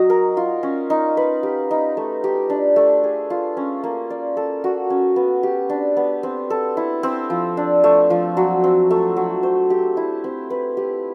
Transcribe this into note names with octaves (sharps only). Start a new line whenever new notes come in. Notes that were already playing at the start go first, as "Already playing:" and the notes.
Already playing: F#3 D#4 F#4 D#5
A#4
F4
C#4
D#4
B4
G4
D#4
A3
G4
D4
A3
G#4
F4
C#4
A#3
D5
A4
F#4
C#4
B3
G4
D4
B3
C4
A4
E4
C4
F3
D4
A3
F3
F#3
C4
A3
F#3
C5
G4
E4
C4
B4
G4